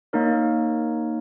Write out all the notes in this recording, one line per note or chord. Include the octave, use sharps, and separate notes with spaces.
A#3 D#4 A#4 C#5